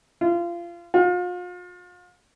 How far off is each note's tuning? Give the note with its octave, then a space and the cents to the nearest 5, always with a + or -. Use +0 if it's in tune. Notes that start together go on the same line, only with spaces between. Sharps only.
F4 -25
F4 +40